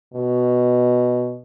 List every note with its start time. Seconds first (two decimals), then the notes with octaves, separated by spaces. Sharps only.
0.14 B2